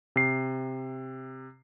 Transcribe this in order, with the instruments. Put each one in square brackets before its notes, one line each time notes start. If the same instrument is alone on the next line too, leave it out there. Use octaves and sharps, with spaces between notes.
[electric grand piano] C3 C7